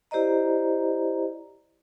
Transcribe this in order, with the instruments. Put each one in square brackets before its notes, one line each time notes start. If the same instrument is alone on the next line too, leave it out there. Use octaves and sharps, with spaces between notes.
[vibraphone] E4 G4 C5 D5 D#5 A#5